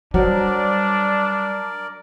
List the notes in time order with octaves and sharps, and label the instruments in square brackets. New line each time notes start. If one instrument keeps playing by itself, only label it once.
[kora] F#3 C5 D#5 [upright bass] G3 [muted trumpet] D4 [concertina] A#4 D5